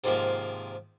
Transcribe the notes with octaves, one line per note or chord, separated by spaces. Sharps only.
G#2 C3 D#3 F3 A#3